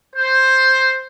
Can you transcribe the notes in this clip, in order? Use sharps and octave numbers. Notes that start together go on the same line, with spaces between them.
C5